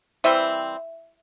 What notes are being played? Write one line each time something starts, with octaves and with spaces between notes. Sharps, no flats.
E3 G3 C4 E5